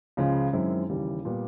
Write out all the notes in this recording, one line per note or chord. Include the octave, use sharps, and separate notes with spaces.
C#2 C#3 F3 G#3
F#2 D#3 G#3 C4 E4
D#2 C#3 E3 G3
A#2 G3 B3